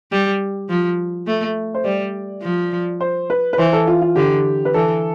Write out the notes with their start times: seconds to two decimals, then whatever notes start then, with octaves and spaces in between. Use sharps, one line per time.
0.12 G3
0.70 F3
1.27 A3
1.74 C5
1.84 G3 D5
2.42 F3
3.01 C5
3.30 B4
3.53 B4
3.58 E3 C5
3.73 A4
3.87 F4
4.02 F4
4.16 D3 G4
4.65 B4
4.74 E3 A4